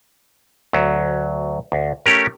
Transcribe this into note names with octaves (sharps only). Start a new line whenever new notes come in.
D2 F#3
D2
A3 C#4 G4 A#4